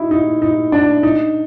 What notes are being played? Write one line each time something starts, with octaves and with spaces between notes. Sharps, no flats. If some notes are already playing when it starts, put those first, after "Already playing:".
Already playing: D#4 E4 F#4
D#4
D#4
D4
D#4